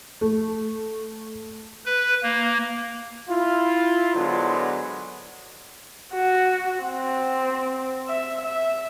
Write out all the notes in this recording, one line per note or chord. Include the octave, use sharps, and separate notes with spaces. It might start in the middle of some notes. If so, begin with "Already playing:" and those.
A3
B4
A#3
E4 F4
D3 F#3 G#3 B3 D4 C5
F#4
C4
E5
E5